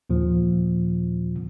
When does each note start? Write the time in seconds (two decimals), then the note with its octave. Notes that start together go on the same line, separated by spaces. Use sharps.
0.10 D#2 A#2 F3